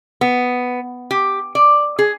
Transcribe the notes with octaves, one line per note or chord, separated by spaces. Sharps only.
B3
G4
D5
G#4